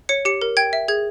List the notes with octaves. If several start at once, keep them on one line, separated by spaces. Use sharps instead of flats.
C#5 C#7
G4 C#7
A#4
G5 G#6
E5
G#4 G#6